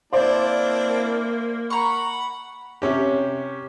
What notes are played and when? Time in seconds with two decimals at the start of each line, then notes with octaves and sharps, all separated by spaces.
0.13 A#3 C4 D4 E4 C5 D5 F5
1.70 F#5 A#5 B5 C#6
2.82 C3 C#4 G4